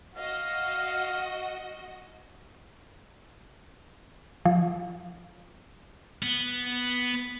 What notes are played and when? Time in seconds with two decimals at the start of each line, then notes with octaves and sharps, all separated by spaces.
0.17 F#4 D#5 F5
4.45 F3
6.23 B3